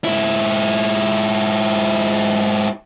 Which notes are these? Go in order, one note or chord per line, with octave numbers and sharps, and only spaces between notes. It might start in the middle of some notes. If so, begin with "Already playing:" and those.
G#2 E4